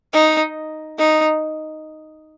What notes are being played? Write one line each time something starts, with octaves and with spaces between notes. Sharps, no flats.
D#4
D#4